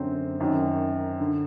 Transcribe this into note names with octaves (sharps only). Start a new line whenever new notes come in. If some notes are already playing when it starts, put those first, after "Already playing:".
Already playing: F#2 D3 C4 C5
F#2 D#3
D3